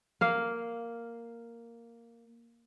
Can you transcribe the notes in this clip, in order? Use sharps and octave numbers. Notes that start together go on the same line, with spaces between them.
A#3 F5